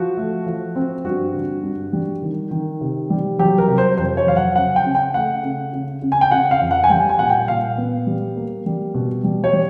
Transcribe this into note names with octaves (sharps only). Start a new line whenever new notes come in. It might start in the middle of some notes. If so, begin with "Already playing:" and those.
Already playing: F3 F#4
A3
F3
C4
G2 F#4
D3
G2
G3
D#3
D#3
C3
G3
F#3 G4
A#4
C3
C5
F2 C5
C#5
F#3 F5
F#5
C#3 F#5
G5
C#3
G5
A3 F#5
C#3
C#3
C#3
G#5
G5
C#3 F#5
F5
F2
F#5
G#5
G3 G5
G#5
A#2 F#5
G5
A#2 F5
B3
G3
A#3
G3
B2
G3
C#5
G3